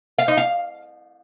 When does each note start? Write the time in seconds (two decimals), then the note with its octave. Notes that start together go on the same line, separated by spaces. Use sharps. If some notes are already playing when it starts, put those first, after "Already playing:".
0.19 F5
0.28 D#4
0.37 F5